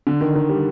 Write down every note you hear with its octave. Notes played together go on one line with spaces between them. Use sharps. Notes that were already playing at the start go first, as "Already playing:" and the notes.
D3
D#3
D#3
G3